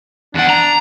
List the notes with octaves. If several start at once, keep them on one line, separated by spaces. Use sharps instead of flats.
E2 D4 F#5
A#5